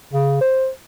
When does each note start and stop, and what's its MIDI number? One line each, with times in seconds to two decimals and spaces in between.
0.14 0.40 49
0.41 0.69 72